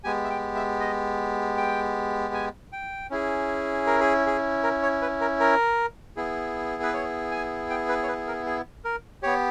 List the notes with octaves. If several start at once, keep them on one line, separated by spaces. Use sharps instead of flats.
G#3 B3 G4 G#5
E5
G5
E5
D#5
G5
G#5
G5
C#4 E4 G#4
A#4
G#4
G#4
A#4
C#5
B4
A#4
A#4
B3 E4 G#4
B4
C#5
G#5
G5
B4
C#5
B4
A#4
G#4
A#4
B3 G4 C#5